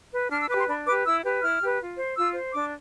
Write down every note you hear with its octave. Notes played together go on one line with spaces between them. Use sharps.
B4
D4 F6
E6
G4 B4 D6
C6
D4 B5
G4 B4 D6
E4 E6
G4 B4
E4 F6
G4 B4
F4
C5
F4 E6
C5
D4 D6